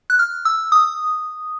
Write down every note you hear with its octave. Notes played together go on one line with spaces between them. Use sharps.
F#6
F6
E6
D#6